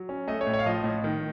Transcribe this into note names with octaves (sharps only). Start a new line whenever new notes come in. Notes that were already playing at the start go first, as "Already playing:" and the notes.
Already playing: F#3
C#4
A3 D#5
C#5
A2
C#5
F5
F3 D#5
A2
D#3